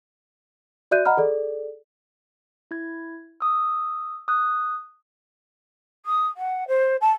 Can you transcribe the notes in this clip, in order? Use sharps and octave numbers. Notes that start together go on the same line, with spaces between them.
F#4 D5 E5 F#6 G6 D#7
D#5 F#5 A#5 B5 F6
G#4 A4 D5
E4 G#6
D#6 E6
D#6 F#6
D#6
F#5
C5
A5